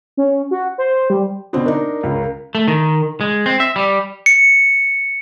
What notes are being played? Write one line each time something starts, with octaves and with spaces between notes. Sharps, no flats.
C#4
F#4
C5
G3
B2 D3 C4
D4 D#4 A#4
C#2 C#3
A3
D#3
G#3
C4
E5
G3
C#7